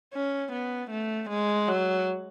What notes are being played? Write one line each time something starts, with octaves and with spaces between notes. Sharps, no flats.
C#4
B3
A3
G#3
F#3